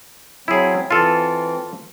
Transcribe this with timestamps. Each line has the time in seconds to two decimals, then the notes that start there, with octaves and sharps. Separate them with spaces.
0.48 F#3 C4 E4 G#4
0.91 E3 C4 F4 A4